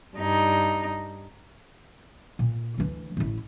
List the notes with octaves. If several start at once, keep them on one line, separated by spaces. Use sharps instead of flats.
G2 D#4
A#2
D2 E3
A1 E4